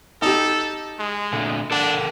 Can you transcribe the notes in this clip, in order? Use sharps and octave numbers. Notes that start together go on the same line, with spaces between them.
D#4 G4 A4
G#3
A#2 D3 A3
D4 A4 A#4 F#5